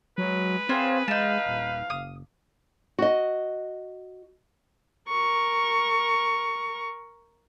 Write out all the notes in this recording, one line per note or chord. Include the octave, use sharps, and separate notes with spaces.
F#3 G#3 B4
C4 F4 G#4 C5 C#5
G#3 D#4 F5 A5
D#1
F#1 D#6
F#4 D#5
A#4 C#6